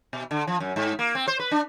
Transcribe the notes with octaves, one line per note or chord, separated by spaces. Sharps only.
B2
D3
F3
F#2
G#2
A#3
C4
C5
B4
D4